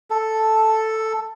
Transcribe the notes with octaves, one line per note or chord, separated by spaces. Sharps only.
A4